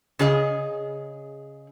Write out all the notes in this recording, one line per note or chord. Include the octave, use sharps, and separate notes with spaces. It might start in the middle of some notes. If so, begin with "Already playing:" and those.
C#3 G#4 D#5